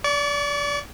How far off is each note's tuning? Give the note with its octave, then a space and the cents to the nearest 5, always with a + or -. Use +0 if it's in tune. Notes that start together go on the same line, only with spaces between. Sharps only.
D5 -25 C#6 +30